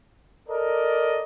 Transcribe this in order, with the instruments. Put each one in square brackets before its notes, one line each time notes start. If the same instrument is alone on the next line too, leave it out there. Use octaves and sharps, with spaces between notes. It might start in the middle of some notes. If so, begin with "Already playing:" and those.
[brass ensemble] A4 A#4 D5 D#5